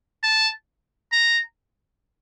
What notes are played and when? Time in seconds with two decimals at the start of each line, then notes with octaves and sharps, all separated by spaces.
0.23 A5
1.12 A#5